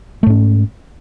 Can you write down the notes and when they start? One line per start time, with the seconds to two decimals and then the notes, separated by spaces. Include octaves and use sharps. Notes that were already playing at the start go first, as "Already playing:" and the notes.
0.23 A3
0.26 G#2
0.30 C#4